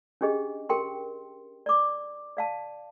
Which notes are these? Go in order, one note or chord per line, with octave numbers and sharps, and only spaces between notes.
C#4 D4 G4 G#4 D#5
G4 A#4 G5 C6
D5 D6
D5 F5 A5